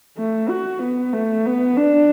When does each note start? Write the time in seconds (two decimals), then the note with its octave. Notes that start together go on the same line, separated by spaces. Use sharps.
0.17 A3
0.49 F#4
0.82 B3
1.13 A3
1.46 B3
1.77 D4